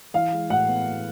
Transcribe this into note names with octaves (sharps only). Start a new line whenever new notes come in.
E3 F5
G#3
A2 F#5
B3
B3